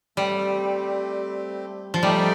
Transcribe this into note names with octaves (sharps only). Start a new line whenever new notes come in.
G3 A3 C4 G4
F3
G3 A3 D#4 G4 D5